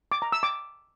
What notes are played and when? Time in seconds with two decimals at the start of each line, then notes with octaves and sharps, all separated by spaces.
0.12 D6
0.22 A#5
0.32 E6
0.43 D6